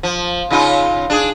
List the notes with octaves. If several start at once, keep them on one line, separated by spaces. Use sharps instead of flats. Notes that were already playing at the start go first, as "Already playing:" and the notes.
F3
C#3 D#4 F4
D4 G#4